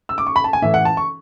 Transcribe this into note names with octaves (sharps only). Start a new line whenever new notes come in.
E6
D6
C#6
B5
A5
G#5
A2 E3 E5
F#5
A5
C#6